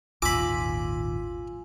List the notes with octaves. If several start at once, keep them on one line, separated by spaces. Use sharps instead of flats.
G#1 D#2 A#2 F4 G#5 B5 D6 E6